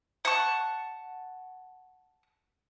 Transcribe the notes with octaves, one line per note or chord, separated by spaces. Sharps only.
F#5 A5 C#6